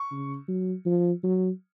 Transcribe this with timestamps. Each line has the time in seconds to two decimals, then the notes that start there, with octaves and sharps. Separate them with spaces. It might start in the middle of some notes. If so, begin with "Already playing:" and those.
Already playing: C#6
0.11 C#3
0.48 F#3
0.86 F3
1.24 F#3